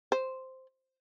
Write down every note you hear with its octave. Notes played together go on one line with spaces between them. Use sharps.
C5